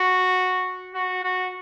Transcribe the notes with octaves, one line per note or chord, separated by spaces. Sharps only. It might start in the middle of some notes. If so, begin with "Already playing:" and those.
Already playing: F#4
F#4
F#4